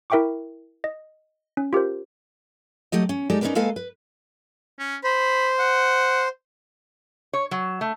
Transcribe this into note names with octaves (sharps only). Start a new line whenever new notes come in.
E4 A#4 E5 G5 C#6 D6
D#5
C#4
F4 G4 A#4 C5
F#3 A3 G4 D#5
C#4
G#3 D#4 G4 A4 D5
C#4 D#4 E4 A#4 B4 D5
G#3 A#3 A4 B4 F5 G#5
B4
C#4
C5 B5
F#5
C#5
F#3
A3